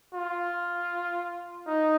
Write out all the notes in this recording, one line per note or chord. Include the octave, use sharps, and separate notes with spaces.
F4
D#4